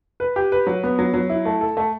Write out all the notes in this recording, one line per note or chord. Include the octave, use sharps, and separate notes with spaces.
B4
G4
B4
F#3
B3
F#3
F#3
E4
A3
A4
A3